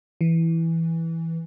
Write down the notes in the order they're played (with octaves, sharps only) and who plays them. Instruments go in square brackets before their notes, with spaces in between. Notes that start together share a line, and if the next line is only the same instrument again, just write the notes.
[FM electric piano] E3